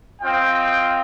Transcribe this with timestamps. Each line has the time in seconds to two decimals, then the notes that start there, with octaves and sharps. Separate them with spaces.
0.20 C4 F4 D#5 G5